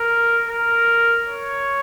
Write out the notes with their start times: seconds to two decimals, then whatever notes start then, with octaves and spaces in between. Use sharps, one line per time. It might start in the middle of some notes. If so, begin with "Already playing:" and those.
Already playing: A#4
0.48 A#4
1.28 C#5